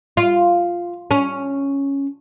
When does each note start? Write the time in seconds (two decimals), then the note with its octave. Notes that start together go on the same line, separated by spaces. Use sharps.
0.17 F4
1.11 C#4